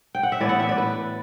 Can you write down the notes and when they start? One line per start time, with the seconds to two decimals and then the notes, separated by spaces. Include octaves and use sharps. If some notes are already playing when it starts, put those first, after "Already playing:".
0.15 G5
0.23 F#5
0.32 E5
0.40 A2 E3 B3 D5
0.49 F#5
0.59 E5
0.69 D5
0.78 B4